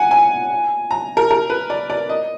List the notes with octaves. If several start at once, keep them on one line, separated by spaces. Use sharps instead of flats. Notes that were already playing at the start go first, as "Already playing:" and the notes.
Already playing: F#5 G#5
G#5
A#5
A#4
A#4
B4
D5
D5
D#5